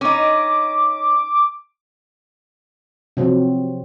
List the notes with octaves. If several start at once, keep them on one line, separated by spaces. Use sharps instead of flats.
C#4 D#4 D6
C3 F3 F#3 C4